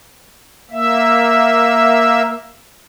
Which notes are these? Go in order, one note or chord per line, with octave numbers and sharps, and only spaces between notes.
A#3 E5